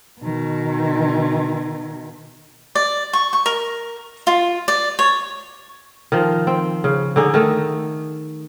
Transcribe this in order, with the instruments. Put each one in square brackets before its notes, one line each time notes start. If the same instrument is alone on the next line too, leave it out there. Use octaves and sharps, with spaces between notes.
[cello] B2 D#3
[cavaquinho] D5
C#6
C#6
A#4
F4
D5
C#5
[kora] D#3 F3
C4
C#3
D3 D#4 G#4
D#3 A3